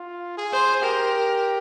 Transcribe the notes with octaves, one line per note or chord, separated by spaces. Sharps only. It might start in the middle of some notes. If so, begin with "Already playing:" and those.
Already playing: F4
G#4
C5
G4 A#4